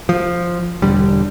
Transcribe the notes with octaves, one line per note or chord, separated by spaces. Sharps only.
F3
E1 D3 G3